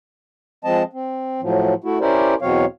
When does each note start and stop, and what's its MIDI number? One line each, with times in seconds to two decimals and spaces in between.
0.65 0.83 53
0.65 0.83 56
0.65 0.83 60
0.65 0.83 75
0.65 0.83 81
0.93 1.41 60
1.42 1.74 45
1.42 1.74 53
1.42 1.74 54
1.84 1.99 57
1.84 1.99 64
1.84 1.99 66
2.01 2.34 61
2.01 2.34 64
2.01 2.34 67
2.01 2.34 70
2.01 2.34 72
2.01 2.34 74
2.42 2.65 40
2.42 2.65 47
2.42 2.65 54
2.42 2.65 60
2.42 2.65 73
2.42 2.65 77